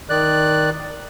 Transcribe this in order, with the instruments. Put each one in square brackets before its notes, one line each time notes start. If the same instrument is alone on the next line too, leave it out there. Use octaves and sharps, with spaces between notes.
[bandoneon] D#3 D5 F#6